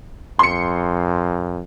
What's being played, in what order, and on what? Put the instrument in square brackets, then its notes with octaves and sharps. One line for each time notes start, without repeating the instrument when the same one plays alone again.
[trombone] F2 [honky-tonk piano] C6 C#7